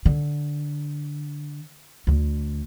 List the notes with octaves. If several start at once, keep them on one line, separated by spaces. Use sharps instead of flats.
D3
D2 D3